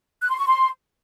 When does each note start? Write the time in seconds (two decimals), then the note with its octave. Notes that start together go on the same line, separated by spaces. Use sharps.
0.22 F#6
0.30 C6
0.38 C#6
0.47 C6